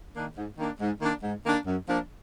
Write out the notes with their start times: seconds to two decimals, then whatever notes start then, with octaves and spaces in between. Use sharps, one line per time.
0.16 D#3 A#3 D4
0.37 G#2
0.58 D#3 A#3 D4
0.81 G#2
1.02 D#3 A#3 D4
1.23 G#2
1.45 D#3 A#3 D4
1.67 F#2
1.89 F3 A#3 D4